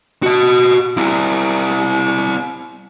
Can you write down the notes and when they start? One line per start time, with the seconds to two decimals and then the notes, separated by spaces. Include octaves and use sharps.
0.23 F#4 D#5
0.97 C4 E4